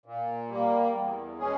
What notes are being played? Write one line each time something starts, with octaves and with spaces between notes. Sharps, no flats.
A#2
G3 A#3
E2
B2 G#3 C#4 G#4